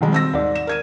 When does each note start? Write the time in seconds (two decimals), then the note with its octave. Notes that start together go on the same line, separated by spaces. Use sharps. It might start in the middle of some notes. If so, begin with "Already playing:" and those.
0.01 B1 F2 B2 D#3 G3 G#3
0.13 C4 E6 A#6
0.34 D#2 G#2 D5
0.55 E7
0.67 A#4 G#6 D#7